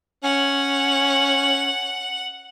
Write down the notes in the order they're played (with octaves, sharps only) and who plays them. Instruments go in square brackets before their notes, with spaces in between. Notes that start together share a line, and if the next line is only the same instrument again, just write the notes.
[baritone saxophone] C#4 [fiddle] F#5